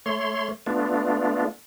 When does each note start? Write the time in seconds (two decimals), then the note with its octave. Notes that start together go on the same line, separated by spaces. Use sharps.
0.06 A3 C#5 C6
0.66 A3 B3 D4 F4